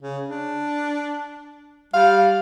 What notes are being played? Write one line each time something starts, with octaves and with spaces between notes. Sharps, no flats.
C#3
D4
G3 F5